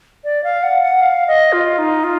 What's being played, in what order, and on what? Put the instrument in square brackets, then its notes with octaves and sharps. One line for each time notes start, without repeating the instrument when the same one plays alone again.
[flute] D5
F5
F#5
F#5
F5
D#5
F4
D#4
F4